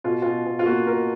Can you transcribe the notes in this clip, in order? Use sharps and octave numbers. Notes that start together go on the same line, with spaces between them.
B2 F4
B2 F4
B2
F4
A#3 F#4
B2 A#4